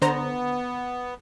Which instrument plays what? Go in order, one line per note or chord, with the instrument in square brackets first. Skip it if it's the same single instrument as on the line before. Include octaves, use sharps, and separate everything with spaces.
[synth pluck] D3 C5 A#5 [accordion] B3